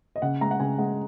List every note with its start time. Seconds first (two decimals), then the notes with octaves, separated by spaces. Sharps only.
0.16 D#5
0.22 C#3 F#5
0.41 G#3 A#5
0.51 F#5
0.60 C#3 G#5
0.78 G#3 F#5